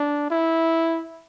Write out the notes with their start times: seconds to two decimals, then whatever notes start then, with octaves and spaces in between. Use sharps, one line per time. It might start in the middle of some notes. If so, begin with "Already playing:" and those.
Already playing: D4
0.30 E4